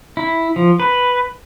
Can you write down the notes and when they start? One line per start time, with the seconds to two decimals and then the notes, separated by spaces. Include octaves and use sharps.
0.17 E4
0.56 F3
0.80 B4